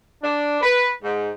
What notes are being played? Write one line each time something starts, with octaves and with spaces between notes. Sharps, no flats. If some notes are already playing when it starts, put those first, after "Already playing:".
D4
B4
G#2